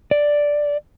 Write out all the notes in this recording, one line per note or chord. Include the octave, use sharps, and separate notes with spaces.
D5